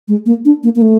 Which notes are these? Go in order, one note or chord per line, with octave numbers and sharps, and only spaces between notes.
G#3
A#3
D4
A#3
A#3
A3